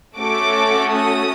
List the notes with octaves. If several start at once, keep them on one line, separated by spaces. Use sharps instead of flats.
A3 C#4 F#4 A4 D6
D#6